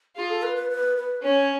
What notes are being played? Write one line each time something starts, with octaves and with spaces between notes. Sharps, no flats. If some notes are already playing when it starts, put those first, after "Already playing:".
F4 G#4
A4
B4
B4
B4
B4
C#4 C#5